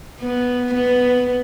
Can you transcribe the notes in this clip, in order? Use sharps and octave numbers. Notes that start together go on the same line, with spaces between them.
B3
B3